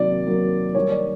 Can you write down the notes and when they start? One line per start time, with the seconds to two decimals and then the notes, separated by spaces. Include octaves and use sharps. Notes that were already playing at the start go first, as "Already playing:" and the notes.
Already playing: C3 D#3 F#3 A#3 D5
0.27 C3 D#3 F#3 A#3
0.75 D#3 G3 A#3 C#5
0.91 D5